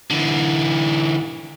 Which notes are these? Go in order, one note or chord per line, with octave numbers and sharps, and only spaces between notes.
D3 E3